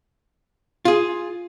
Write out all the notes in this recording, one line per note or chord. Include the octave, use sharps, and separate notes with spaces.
F4 G#4